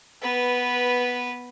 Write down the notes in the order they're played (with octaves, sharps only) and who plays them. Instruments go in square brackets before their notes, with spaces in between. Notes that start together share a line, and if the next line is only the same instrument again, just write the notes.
[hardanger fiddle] B3 B4